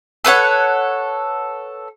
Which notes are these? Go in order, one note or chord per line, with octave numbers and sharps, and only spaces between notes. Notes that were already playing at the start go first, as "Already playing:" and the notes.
A4 B4 C#5 F#5